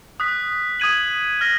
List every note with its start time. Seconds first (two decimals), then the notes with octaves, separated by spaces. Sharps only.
0.20 D#6 F#6 B6
0.80 D#6 G#6 D#7 F#7
1.41 F6 A#6